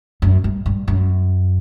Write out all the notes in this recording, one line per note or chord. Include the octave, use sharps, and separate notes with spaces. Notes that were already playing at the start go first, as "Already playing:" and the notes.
F#2
G2
G2
F#2